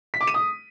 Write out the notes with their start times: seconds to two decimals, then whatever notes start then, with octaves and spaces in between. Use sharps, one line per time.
0.14 B6
0.21 D6
0.27 D#7
0.34 D#6